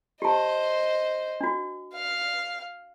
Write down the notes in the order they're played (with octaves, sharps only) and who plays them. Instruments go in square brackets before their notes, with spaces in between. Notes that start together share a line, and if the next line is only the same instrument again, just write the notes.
[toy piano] G4 A5 [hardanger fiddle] C5 D#5
[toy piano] D4 F#4
[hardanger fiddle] F5